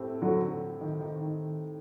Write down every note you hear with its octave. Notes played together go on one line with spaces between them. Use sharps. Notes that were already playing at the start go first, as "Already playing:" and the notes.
Already playing: A2 A3 C4 G4
D3 F#3
D#3
D#3
D#3